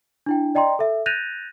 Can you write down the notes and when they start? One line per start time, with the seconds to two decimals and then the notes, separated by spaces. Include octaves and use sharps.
0.26 D4 E4 G5
0.55 D5 D#5 G5 A#5 C6
0.79 A4 E5
1.06 F#6 G6 A6 A#6 D#7 F7